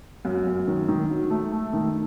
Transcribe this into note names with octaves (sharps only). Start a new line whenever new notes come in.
F#2
F#2
D#3
D#3
F#3
A3
A3
D#3